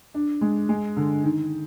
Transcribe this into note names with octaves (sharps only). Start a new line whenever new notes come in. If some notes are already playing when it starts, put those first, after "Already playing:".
D4
G#3
G#3
D3
D#3